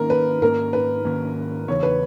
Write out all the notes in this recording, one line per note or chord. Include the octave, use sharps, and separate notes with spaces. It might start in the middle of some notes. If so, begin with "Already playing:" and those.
Already playing: G#2 D#3 A#3 C#4 A#4
B4
G#2 D#3 A#3 C#4 A#4
B4
G#2 D#3 A#3 C#4
E2 C#3 E3 B3 C#5
B4